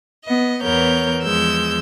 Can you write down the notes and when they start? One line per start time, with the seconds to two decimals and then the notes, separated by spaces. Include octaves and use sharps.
0.25 B3 D#5
0.63 E2 E3 B3 A#4 C#5 G6
1.23 E2 F3 G#3 E6 G6